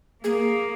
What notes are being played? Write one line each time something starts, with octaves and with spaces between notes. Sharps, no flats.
A#3 G#4